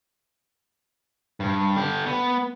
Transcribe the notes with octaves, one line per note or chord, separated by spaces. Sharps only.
G2
D3 G4
B3